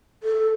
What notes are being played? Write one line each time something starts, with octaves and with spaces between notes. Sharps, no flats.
A4